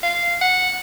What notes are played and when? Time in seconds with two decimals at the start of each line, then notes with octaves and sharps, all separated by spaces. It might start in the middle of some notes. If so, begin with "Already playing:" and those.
0.03 F5
0.42 F#5